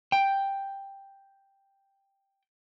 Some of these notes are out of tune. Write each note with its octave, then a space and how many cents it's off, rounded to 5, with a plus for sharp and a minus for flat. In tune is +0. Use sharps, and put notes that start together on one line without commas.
G5 +5